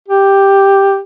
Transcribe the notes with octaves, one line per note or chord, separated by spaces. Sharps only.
G4